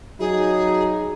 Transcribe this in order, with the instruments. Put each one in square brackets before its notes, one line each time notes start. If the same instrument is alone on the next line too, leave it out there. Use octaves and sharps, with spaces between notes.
[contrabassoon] F#3 [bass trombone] D#4 [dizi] G#4